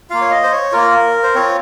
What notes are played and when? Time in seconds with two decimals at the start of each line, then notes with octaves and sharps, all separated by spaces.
0.10 A#3 F4 F5
0.21 C#5
0.31 D#5
0.43 C5
0.52 C#5
0.72 A#3 F4 A#4
1.23 C5
1.35 C4 F4 C#5